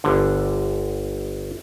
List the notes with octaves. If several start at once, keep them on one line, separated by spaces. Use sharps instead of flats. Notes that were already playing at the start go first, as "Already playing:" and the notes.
G1 D3